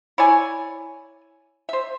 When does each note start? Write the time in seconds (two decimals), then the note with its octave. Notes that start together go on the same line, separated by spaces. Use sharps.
0.18 E4 C#5 D5 G#5
1.69 C5 E5